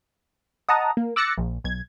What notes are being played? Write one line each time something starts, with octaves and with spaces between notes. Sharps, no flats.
D#5 F#5 A5 A#5 D#6
A#3
D6 E6 F#6 A6 A#6 C#7
A#1
B1 G#6